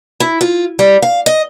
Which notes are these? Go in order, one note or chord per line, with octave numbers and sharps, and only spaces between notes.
E4
F4
G3
F5
D#5